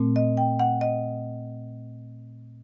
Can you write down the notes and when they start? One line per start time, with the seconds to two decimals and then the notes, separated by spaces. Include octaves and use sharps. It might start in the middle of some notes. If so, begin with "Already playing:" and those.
Already playing: A#2 A3 C4
0.16 D#5
0.37 G5
0.59 F#5
0.81 D#5